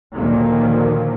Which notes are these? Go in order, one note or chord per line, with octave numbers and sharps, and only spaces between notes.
D2 A#2 D#3 F3 F#3 A#3